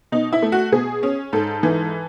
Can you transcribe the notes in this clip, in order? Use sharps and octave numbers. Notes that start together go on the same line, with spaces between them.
B2 D#4
E4
A3
F#4
B2 G#4
C#4
G#2 A4
E3